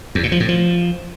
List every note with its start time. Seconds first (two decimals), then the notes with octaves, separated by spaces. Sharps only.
0.15 E2
0.23 A#2
0.32 F3
0.40 A2
0.49 F3